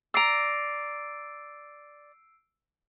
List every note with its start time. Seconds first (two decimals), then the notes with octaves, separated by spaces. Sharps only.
0.14 D5 A#5 E6 C7 D7